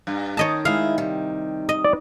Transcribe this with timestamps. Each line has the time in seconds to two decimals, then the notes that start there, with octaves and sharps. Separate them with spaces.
0.07 G2
0.37 D#3 C#5 D#5 A5
0.65 G#3 E4 F5
0.98 C3 G3
1.69 D#5
1.85 D5